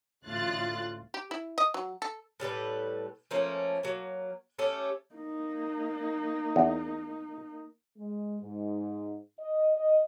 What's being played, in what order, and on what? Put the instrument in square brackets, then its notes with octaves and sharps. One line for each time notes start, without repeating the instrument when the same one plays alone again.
[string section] A1 D2 A2 F4 F#6 A6
[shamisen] G4
E4
D#5
F#3
A4
[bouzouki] A2 G3 A4 B4
F3 A3 A#3 C#4
F#3 A#3
A3 C#4 G4 A4
[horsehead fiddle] A#3 D#4
[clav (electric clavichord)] E2
[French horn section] G#3
G#2
D#5
D#5